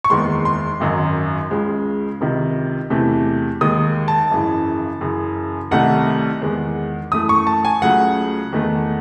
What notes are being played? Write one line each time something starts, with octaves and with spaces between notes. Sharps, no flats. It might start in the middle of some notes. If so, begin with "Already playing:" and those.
C#6
F#1 E2 D#3 G#3 C6
C6
G#1 F#2 D#3 F#3
C#2 C#3 G#3
C#2 C3 D#3
E2 C3 E3 A3
D#2 D#3 G#3 D#6
A5
G#1 F#2 C#3 E3
F#2 C#3 E3
C2 C3 D#3 A3 F#5
E2 D#3 G#3
F#2 E3 A3 D#6
C#6
A5
G#5
C#2 C#3 F#3 A3 F#5
E2 D#3 A3